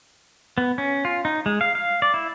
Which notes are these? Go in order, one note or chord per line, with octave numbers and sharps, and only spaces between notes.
B3
C#4
F4
D#4
G#3
F5
F5
D5
E4